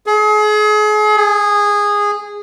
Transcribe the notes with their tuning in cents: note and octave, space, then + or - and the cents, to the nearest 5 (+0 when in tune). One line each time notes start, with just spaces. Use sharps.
G#4 +35
G#4 -15